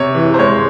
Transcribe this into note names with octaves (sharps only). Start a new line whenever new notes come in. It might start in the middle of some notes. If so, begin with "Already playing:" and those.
Already playing: C3 C#5
E3
C5
G#3 C#5